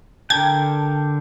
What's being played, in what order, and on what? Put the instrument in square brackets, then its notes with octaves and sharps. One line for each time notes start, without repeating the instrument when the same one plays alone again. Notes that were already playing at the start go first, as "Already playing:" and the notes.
[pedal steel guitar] D3 G5 [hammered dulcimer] G4 A#4 [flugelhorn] A5 [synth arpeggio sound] G#6